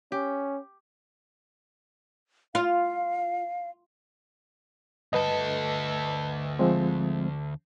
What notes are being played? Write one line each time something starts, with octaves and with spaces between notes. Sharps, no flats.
C#4 G4
F4 F5
D2 G2 A4 B4 D#5
F3 G#3 C4